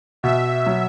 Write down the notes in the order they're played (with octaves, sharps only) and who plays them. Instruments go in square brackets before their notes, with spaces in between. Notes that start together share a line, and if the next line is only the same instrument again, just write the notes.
[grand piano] B2 [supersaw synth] E5
[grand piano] F#3